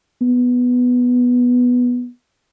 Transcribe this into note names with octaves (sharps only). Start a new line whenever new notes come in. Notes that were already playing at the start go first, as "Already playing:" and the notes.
B3